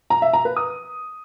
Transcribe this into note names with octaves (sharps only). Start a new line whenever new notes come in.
A#5
E5
A#5
B4
D#6